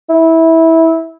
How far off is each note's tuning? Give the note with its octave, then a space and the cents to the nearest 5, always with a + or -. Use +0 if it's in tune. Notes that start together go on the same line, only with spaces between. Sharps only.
E4 -20